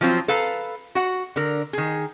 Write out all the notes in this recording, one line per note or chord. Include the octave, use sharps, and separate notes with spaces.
F3 F#3 C4 F4
A4 B4 F5 A#5
F#4 F#5
D3 A#4
D#3 G#4